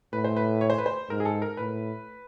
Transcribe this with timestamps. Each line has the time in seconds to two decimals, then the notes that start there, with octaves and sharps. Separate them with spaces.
0.13 A2 B4
0.24 C5
0.36 B4
0.61 C#5
0.70 C5
0.78 B4
0.86 C5
1.10 G#2 A#4
1.20 G#4
1.25 A4
1.42 A#4
1.57 A2 B4